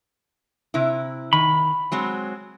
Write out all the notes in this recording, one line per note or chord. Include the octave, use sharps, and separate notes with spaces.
C3 E4
D#3 B5
F#3 G#3 C4